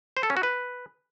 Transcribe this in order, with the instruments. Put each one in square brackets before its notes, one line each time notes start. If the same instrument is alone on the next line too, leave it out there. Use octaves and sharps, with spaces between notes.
[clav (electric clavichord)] C5
A4
C#4
F#4
B4